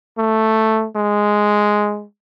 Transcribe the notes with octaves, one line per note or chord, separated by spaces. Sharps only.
A3
G#3